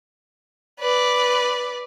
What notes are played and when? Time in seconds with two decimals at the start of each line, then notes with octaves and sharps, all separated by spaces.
0.80 B4 D5